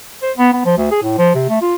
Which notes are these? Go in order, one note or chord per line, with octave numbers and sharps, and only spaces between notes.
C5
B3
B3
F3
D2
G#4
A2
F3
C3
A3
F4